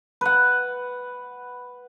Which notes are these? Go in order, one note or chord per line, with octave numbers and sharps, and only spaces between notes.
B4 F#5